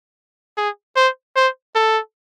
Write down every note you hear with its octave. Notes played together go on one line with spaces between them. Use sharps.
G#4
C5
C5
A4